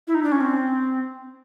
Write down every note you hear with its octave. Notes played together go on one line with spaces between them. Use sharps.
E4
D#4
D4
C#4
C4